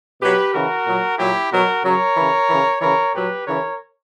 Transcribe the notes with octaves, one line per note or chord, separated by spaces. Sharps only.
B2 F#3 G4 B4
C#3 E3 F#4 A#4
A#2 F#3
A#2 F#3 E4 G4
B2 F#3 F#4 A#4
C#3 F#3 A#4 C#5
C#3 E3
C#3 E3
C#3 E3 A#4 C#5
A#2 F#3 G4 B4
C#3 E3 A#4 C#5